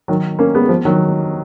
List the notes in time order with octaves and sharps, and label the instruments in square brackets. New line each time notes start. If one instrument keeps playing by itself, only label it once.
[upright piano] D#3 F#3
A#3 C#4
G#3 B3
F3
D#3 F#3